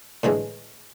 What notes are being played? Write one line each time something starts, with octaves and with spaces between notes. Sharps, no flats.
A2 D3 E3 G#3